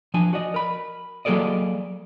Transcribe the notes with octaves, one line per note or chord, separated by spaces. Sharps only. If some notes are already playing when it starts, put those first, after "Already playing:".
F3 D4 G#5
F#4 D5 D#5
A#4 B5
F#3 A#3 G#4 A4 D5 D#5